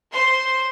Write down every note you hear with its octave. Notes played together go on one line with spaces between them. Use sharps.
C5 C6